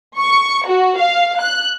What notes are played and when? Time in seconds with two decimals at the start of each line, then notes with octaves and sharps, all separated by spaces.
0.18 C#6
0.67 F#4
0.97 F5
1.41 F#6